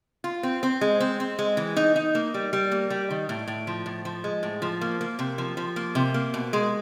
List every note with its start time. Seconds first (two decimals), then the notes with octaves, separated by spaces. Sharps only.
0.24 F4
0.43 C4
0.63 C4
0.81 G#3
1.00 C4
1.20 C4
1.39 G#3
1.57 E3
1.77 D#4
1.96 D#4
2.15 A#3
2.34 G3
2.53 G3
2.72 A#3
2.90 G3
3.11 D#3
3.29 A2
3.48 A2
3.67 F3
3.86 A2
4.05 F3
4.24 G#3
4.43 A2
4.62 F3
4.81 A#3
5.01 A#3
5.19 C3
5.38 F3
5.57 F3
5.76 A#3
5.95 C3
6.14 A#3
6.34 B2
6.53 G#3